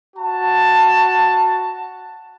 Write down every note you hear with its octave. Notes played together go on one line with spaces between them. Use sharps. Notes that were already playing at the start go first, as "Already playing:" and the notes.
F#4 A5